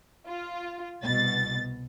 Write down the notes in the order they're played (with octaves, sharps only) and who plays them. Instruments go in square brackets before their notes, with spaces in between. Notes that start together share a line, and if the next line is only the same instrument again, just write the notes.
[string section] F4
C2 B2 A6